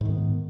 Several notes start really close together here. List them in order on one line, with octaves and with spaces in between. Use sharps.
G#2 D#3 B3